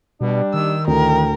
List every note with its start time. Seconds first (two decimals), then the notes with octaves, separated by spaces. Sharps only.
0.21 B2 G3 D4 D5
0.54 D#3 E6
0.87 D2 A2 A#4 G5